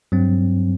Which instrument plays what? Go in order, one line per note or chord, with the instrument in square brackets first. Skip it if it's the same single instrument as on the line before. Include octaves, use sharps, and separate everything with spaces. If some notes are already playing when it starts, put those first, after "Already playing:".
[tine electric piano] G2 F#3 C4